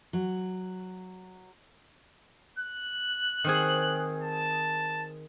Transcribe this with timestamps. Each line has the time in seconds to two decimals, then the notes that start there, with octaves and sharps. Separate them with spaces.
0.13 F#3
2.59 F#6
3.44 D#3 C4 G#4
4.21 A5